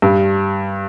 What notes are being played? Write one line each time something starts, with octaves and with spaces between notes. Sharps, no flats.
G2